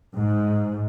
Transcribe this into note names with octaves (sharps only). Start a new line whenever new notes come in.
G#2